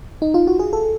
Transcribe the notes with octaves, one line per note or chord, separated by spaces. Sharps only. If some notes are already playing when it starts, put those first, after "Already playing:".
D#4
F4
F#4
G#4
A4